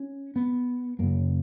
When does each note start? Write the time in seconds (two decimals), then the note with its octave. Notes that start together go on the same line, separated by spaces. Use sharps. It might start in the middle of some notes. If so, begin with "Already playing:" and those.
Already playing: C#4
0.36 B3
0.99 F#2 C#3 A#3